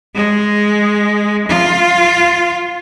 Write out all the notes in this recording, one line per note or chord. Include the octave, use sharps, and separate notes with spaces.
G#3
F4